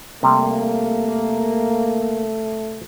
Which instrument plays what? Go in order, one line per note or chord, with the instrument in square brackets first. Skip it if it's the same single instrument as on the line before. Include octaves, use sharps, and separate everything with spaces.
[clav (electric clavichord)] C3 G3 [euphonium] A3 [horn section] A#3